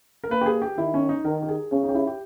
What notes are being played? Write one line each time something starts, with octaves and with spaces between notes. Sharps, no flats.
A#4
A#3 B4
G4
G#4
G4
D#3 E4
C#4
D#4
D#3 A#4
G4
G#4
C#3 C#4
D#4
G4
E4
G4